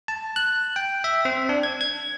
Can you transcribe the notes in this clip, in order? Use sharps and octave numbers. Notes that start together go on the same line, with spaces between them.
A5
F#6
G5
E5
C4
D4
G#6
G#6